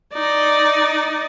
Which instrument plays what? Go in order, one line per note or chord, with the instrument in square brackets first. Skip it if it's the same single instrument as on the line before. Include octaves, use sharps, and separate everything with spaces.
[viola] D#4 D5